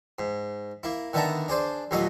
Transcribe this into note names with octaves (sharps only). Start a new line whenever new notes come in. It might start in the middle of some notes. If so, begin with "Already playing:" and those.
G#2
A#3 E4
D3 D#3 B3 E5 A5 A#5
D4 G#4 C5 D5
D#2 A#2 F#3 A3 D#5 B5